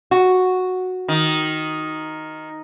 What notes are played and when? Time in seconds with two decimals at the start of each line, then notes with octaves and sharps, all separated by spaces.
0.11 F#4
1.08 D#3